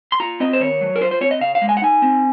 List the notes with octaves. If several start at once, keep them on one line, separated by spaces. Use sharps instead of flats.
C6
F4 A#5
C4 D#5
C5
D#3 C#5
F#3
A#4
F4 C5
C5
C4 C#5
D#5
C#3 F5
F5
G#3
G#5
F#5
D#4 G#5
C4